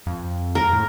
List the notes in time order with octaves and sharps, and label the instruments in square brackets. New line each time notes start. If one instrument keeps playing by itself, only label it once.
[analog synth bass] F2
[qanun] A#4
[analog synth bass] A2